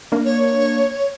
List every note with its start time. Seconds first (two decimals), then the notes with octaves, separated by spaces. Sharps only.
0.12 A#3 D4
0.25 C#5